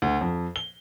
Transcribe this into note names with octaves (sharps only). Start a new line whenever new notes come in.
D2
F2
G7